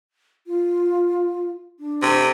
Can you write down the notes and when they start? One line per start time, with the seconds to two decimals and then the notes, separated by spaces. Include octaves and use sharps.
0.47 F4
1.79 D4
2.02 C3